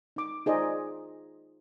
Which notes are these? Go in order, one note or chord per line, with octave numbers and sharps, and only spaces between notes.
D#4 D6
D#4 F4 G#4 C5 D5 D#5